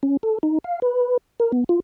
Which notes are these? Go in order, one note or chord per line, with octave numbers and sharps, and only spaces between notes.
C#4
A4
D#4
F5
B4
A#4
B3
F4